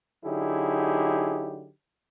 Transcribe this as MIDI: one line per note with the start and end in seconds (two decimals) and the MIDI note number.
0.25 1.69 50
0.25 1.69 54
0.25 1.69 63
0.25 1.69 64
0.25 1.69 67
0.25 1.69 68